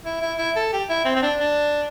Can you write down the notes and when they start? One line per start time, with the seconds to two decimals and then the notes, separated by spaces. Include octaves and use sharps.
0.05 E4
0.22 E4
0.39 E4
0.56 A4
0.73 G4
0.90 E4
1.05 C4
1.16 C4
1.23 D4
1.40 D4